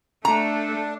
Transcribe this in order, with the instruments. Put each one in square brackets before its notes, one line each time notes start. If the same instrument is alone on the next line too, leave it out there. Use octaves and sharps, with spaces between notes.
[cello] A3 A4 [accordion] D4 [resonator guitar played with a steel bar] A#5